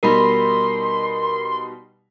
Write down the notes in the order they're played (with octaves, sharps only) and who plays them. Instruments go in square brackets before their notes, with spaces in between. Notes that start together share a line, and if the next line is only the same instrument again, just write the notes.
[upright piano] B2 G3 D#4 [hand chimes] A#4 B5 A#6 [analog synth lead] C6